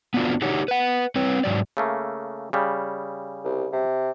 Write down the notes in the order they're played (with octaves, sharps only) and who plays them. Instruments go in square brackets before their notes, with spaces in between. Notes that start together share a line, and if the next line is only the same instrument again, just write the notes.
[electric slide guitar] B3 C4 D4 D#4 F4 F#4
D4 D#4 F#4 G4 C#5
B4 F#5
C4 B4 C#5
G#2 F#3 D5
[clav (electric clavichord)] C#3 A3 A#3
C#3 G3
[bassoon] C2
C3